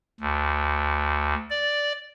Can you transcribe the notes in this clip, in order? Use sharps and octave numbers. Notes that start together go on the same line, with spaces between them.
D2
D5